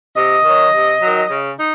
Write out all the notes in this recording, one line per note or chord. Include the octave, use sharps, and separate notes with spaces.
C3 D#5
D#3 F#3
C3
D#3 F#3
C#3
D#4